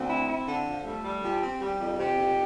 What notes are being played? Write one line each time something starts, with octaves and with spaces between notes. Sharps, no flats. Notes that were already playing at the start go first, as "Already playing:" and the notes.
Already playing: D2 C4
E4
E4
D3
F3
G3 A3
G3
F3 G4
C4
G3 G4
F2
C3 G4
F2